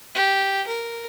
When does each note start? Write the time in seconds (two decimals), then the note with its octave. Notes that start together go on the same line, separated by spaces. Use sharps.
0.15 G4
0.67 A#4